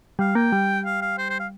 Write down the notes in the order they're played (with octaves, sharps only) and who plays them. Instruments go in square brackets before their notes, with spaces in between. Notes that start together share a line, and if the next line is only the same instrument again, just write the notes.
[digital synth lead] G3 [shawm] F5
[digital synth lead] A#3 [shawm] G5
[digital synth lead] G3
[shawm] F5
F5
C5
C5
F5